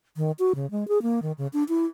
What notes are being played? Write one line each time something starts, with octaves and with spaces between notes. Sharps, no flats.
D#3
F#4
C#3
G#3
G#4
A#3
D#3
C#3
D4
E4